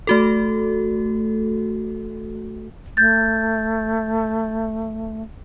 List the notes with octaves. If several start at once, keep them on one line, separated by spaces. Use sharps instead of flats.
A3 F#4 A4
A3 G6 A6